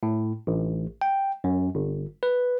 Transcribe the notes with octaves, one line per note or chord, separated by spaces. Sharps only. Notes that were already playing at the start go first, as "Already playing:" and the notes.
A2
A1
G5
F#2
G1
B4